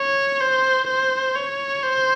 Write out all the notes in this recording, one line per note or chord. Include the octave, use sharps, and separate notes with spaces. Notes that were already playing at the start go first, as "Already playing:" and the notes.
Already playing: C#5
C5
C5
C#5
C5